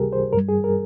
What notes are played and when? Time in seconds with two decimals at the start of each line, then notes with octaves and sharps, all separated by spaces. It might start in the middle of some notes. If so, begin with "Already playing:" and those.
Already playing: C#2 C3 G3 G4 G#4 A#4
0.13 C5
0.33 G2 G3 A#4
0.49 G#4
0.64 A#4